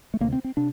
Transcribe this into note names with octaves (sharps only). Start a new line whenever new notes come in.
A3
D2 C3 A#3
C4
C4
C3 D4